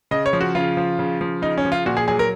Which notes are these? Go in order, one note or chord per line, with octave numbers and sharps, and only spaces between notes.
C#3 D#5
C#5
F3
F#4
C#3 F4
F3
C#3
F3
C#3 D#4
C#4
F3
F4
A#2 F#4
G#4
F#3 G#4
A#4